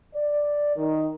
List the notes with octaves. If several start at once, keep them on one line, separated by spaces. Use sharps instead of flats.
D5
D#3